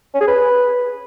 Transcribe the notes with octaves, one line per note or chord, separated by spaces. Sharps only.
C#4
G#4
B4